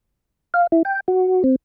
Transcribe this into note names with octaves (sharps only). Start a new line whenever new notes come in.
F5
E4
G5
F#4
C4